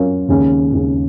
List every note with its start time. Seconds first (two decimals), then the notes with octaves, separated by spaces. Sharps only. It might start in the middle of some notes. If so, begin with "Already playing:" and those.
Already playing: F#3 C#4 F4 A#4 C#5
0.29 D#2 C#3 G#3 C#4 G#4
0.73 D#2 C#3 G#3 C#4 G#4